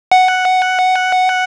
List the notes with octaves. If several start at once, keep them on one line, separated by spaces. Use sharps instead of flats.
F#5